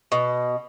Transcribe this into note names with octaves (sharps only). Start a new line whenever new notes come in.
B2